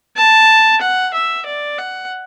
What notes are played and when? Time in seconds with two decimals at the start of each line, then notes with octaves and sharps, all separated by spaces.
0.17 A5
0.81 F#5
1.14 E5
1.46 D5
1.78 F#5